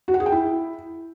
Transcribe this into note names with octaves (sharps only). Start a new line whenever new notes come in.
F#4
F#5
G#4
G5
E4